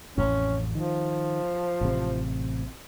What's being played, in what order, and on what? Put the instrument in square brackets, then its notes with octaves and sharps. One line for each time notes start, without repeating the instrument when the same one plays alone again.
[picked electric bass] A1 F2 [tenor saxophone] C#4
[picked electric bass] D#3 [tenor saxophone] F3
[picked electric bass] A1 C3